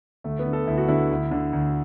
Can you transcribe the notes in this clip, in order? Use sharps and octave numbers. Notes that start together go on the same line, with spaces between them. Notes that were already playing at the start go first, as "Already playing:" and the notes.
D2 A3
B3
D3
A4
D2 E4
F#4
D3 E4
D2
D3
D2